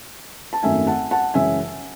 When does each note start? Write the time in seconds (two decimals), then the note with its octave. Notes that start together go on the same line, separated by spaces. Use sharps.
0.53 A5
0.63 G#1 F#2 D#3 F#3 A3 E5 G#5
0.87 F#5 A5
1.11 F#5 A5
1.34 F#2 C#3 E3 G#3 C#4 E5 G#5